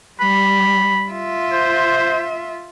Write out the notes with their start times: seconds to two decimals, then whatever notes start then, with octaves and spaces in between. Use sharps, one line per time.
0.20 G3 B5
1.11 F4 E5
1.52 C5